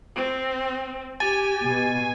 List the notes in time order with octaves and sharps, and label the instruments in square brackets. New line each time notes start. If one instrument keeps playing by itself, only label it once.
[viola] C4
[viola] G4 [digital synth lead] G#5 [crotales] A6 D#7
[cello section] B2